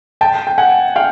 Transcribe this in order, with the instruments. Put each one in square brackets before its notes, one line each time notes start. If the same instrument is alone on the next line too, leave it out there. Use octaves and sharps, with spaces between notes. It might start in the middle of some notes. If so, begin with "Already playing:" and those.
[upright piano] G5 A5
G5
F#5 G#5
F5 G5